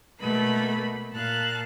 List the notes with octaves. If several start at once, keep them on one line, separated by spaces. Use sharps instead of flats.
B2 A3 A#3 B4 B5
A#2 F5 A5 F#6